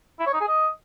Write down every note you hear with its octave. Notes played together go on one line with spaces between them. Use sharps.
E4
C#5
D#4
G#4
D#5